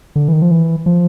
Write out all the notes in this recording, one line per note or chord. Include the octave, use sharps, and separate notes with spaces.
D3
E3
D#3
F3
E3
F3